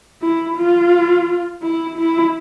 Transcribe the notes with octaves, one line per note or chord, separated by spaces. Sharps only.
E4
F4
E4
E4